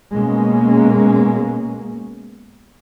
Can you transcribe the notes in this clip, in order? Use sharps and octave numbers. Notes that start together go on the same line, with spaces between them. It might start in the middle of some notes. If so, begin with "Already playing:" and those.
B2 G#3 A#3 C#4